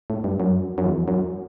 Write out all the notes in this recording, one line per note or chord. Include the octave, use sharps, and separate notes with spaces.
A2
G2
F#2
F#2
E2
F#2